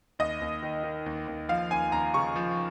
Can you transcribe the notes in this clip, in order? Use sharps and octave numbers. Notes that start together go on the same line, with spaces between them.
D#2 D#5
D#2
D#3
D#3
D#2
D#2
F3 F5
D#2 G#5
D#2 A#5
C#3 C#6
F3